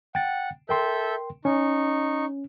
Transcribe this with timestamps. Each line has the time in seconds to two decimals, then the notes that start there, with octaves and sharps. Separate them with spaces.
0.15 F#5 G5 A6
0.69 A4 A#4 E5 G5 C6 G6
1.45 C#4 D#4 C#6